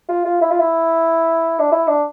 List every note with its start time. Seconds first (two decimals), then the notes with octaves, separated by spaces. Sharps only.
0.09 F4
0.25 F4
0.41 E4
0.51 F4
0.60 E4
1.59 D4
1.72 E4
1.88 D4